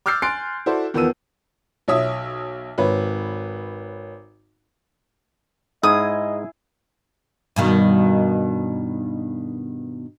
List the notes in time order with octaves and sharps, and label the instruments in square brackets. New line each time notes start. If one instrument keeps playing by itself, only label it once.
[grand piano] D6 E6 F6 G6 A6 C7
G#5 C6 F#6 A6 C7 D7
E4 F#4 A4 C5 D5
E2 D#3 F3 B3 E6 D#7
[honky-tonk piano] B1 C#5 E5 D#6
G#1 B4 C#5
[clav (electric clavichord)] G#2 [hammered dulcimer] E4 G#4 [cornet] D#5 [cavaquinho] D#6
[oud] G2 B2 D#3